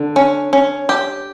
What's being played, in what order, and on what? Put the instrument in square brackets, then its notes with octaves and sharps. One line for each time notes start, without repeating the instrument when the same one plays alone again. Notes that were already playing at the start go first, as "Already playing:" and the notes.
Already playing: [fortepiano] D3
[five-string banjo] C#4
C#4
G4